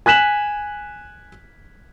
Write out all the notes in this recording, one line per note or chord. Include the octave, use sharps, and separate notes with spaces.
G#5 F#6 B6 E7 F#7